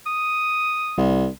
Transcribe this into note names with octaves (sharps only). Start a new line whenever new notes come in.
D#6
C2